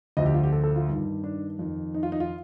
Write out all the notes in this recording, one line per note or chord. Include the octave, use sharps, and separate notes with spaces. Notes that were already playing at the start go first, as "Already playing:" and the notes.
D2 D3 F3 D#5
G4
F4
G4
A4
A4
F4
G2 D#3
D4
F2 D#3
D#4
F4
D#4
F4